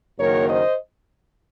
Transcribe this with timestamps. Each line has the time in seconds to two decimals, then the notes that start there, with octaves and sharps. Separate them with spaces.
0.19 F#1 F#2 D#3 F#3 A#3 A#4 C#5
0.49 C5 D#5